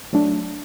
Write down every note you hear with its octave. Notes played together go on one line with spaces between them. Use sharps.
F#3 A3 D4